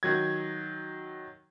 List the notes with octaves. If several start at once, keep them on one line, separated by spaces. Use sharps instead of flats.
D#3 F#3 G#6